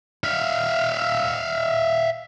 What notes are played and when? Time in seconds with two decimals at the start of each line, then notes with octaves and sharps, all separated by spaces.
0.24 E5 F5